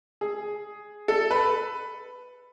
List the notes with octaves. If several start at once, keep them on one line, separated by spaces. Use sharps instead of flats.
G#4
A4
B4